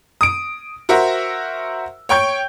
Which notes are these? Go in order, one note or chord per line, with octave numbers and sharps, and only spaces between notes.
D#6 D7
F#4 A#4 C5 E5
C#5 G5 C#6 G6